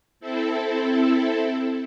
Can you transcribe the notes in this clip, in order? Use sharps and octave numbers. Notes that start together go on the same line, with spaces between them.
C4 E4 A4